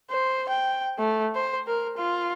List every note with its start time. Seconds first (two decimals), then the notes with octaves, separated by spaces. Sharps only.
0.11 C5
0.49 G5
0.99 A3
1.35 C5
1.67 A#4
1.98 F4